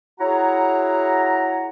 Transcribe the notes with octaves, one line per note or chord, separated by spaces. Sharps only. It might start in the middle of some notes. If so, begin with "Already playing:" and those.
E4 F#4 G#4 C#5 F#5 A#5